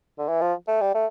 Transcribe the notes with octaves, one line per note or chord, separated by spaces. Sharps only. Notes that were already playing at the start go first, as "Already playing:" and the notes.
D3
E3
F3
A3
G3
A3